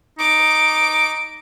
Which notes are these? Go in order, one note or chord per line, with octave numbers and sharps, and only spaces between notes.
D#4 D6